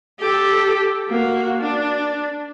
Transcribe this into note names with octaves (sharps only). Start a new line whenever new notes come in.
G4 A4
A#3 F#4
D4